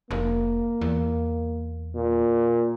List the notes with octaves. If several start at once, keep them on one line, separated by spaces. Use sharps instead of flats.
F1 A#3
E2
A#2